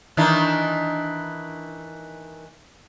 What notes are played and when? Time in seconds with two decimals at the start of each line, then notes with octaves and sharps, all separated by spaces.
0.17 D#3 E3 D4